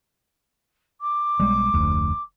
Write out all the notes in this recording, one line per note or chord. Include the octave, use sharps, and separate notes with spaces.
D6
B1 G3 G#3
F1 D2